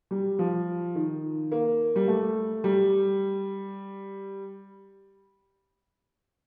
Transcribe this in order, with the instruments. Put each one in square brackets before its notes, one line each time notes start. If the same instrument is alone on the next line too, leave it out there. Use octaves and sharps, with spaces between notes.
[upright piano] G3
F3
D#3
A#3
G3
A3
G3